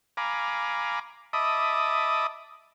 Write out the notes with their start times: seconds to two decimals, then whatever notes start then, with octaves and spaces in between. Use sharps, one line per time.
0.17 F5 G#5 A#5 B5 D6
1.33 D#5 E5 A5 B5 D6 D#6